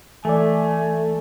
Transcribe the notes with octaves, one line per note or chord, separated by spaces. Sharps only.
E3 A3 A4 D5 G#5